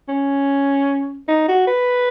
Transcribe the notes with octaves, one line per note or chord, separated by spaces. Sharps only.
C#4
D#4
F#4
B4